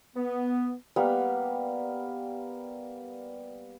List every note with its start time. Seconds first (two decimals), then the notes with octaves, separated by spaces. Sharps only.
0.16 B3
0.96 G3 A#3 B3